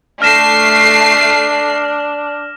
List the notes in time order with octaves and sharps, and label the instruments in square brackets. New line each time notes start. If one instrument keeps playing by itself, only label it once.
[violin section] A3 C7 [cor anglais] D4 [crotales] F6 A#6 E7